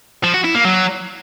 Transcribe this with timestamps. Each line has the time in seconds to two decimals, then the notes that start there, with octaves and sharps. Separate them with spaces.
0.24 F3
0.34 F#4
0.44 E4
0.54 A#3
0.65 F#3